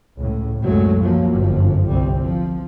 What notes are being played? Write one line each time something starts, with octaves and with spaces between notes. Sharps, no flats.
C#2 A2
C2 F#2 F#3 G#3 A3
F3 F#3 A#3
G1 F#2 F3
G1 C2 G3 C4
F3